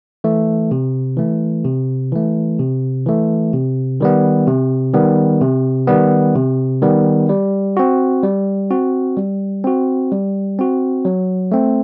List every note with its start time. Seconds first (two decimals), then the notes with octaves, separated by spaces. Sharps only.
0.24 E3 A3
0.71 C3
1.17 E3 A3
1.65 C3
2.12 E3 A3
2.59 C3
3.06 E3 A3
3.53 C3
4.01 D#3 G3 B3
4.48 C3
4.94 D#3 G3 B3
5.42 C3
5.87 D#3 G3 B3
6.35 C3
6.82 D#3 G3 B3
7.29 G3
7.77 C4 F#4
8.23 G3
8.71 C4 F#4
9.17 G3
9.64 C4 F#4
10.12 G3
10.59 C4 F#4
11.05 F#3
11.52 A3 C4